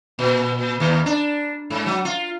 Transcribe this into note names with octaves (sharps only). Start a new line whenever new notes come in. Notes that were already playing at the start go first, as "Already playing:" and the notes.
A#2
D#2
D4
G#2
F#3
F4